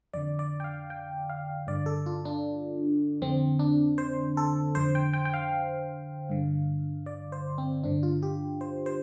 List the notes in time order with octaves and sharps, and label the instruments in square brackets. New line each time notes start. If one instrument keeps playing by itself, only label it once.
[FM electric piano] F2 D3 D5
D5
G5
F5
G5
F5
G2 D3 D5
A4
F4
D4
F2 D3 C4
D4
C5
A4
F2 D3 C5
G5
G5
G5
F5
G2 D3
D5
C5
C4
G2 D3 D4
F4
G4
C5
C5